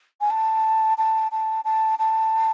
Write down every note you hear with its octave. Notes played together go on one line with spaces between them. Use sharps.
G#5
A5
A5
A5
A5
A5